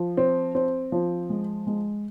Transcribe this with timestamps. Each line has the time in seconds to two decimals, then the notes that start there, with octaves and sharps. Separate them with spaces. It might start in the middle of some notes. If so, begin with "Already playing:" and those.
Already playing: F3
0.17 C4
0.55 C4
0.92 F3
1.30 G#3
1.67 G#3